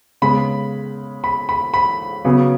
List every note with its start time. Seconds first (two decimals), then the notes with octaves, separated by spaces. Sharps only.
0.22 C#3 G#3 B3 B5
1.24 B5
1.49 B5
1.74 B5
2.25 C#3 F#3 B3